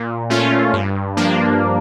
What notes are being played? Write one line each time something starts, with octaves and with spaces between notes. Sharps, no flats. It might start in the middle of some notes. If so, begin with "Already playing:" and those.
Already playing: A#2
A3 C#4 F4
G2
F3 A#3 D4